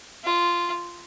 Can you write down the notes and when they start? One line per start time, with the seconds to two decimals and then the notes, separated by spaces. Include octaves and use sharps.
0.25 F4